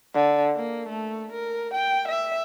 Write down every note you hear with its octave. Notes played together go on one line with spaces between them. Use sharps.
D3
A#3
A3
A#4
G5
E5